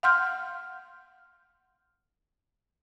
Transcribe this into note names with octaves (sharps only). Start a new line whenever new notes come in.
F5 F#5 C6 F6 G6